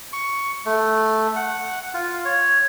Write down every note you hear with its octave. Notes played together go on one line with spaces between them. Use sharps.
C#6
A3
F#5
F4
C#5